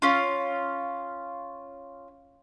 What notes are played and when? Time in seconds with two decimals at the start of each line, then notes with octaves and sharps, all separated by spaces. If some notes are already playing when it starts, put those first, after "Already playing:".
0.02 C#4 F4